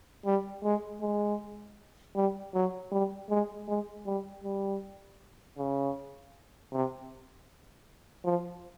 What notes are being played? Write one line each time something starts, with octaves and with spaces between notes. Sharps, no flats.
G3
G#3
G#3
G3
F#3
G3
G#3
G#3
G3
G3
C#3
C3
F3